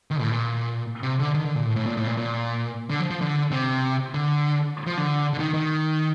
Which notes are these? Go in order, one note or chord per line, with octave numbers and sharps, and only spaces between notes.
D#3
A2
A#2
C3
D3
D#3
D3
A#2
A2
A2
A#2
A2
A#2
A#2
D3
F3
F3
D3
C3
D3
F3
D3
D3
D#3
D#3